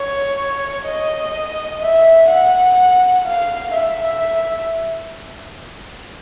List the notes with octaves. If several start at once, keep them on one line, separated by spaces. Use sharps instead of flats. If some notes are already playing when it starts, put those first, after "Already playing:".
Already playing: C#5
D#5
E5
F#5
F5
E5